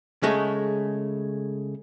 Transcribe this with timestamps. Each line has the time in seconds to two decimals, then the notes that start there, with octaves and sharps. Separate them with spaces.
0.23 C#3 G#3 A3